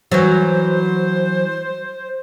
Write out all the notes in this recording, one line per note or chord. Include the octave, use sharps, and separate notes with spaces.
E3 F#3 C5